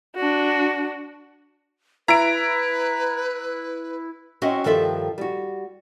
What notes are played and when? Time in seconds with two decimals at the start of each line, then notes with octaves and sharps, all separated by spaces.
0.16 D4 F#4
2.08 E4 B4 A#5 D7
4.42 C4 C#4 F#4 D#5 E5
4.64 G2 D#3 F3 A4 E5
5.18 G3 F#4